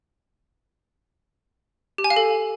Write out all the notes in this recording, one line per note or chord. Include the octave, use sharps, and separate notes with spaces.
G4
G#5
F5
A4